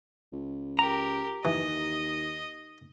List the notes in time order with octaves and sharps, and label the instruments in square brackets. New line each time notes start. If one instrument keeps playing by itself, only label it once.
[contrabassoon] C#2
[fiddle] G4 A#4 [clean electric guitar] A#5
[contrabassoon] D#2 [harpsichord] E3 [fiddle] D#5